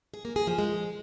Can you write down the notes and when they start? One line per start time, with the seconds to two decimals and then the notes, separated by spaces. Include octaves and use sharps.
0.14 G#4
0.25 A#3
0.36 G#4
0.47 F3
0.58 G#3